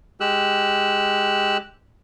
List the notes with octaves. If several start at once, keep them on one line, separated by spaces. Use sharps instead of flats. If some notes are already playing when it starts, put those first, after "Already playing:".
G#3 G4 E6 F#6